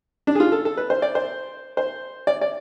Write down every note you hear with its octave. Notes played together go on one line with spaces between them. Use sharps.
D4
G#4
F4
A4
A4
B4
C5
D5
C5
C5
D5
D5